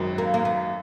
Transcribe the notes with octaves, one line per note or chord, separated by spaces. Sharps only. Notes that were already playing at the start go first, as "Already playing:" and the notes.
Already playing: G#1 F#2 D#3 F#3
A#3
A#3
B3